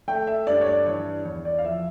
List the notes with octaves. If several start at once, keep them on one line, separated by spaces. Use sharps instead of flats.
A3 G5
E5
G2 D5
C#5
D5
E3 C#5
E2 C#5
D5
F5
F3 E5